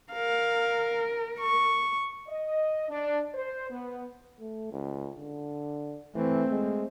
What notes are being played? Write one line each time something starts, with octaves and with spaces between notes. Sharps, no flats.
A#4 F5
C#6
D#5
D4
C5
B3
A3
C#2
D3
E3 A3 C4
G#3